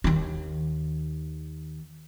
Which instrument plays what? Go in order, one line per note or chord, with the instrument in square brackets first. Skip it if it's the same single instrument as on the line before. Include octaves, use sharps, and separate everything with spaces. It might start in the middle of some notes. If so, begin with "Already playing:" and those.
[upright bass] D#2 D#3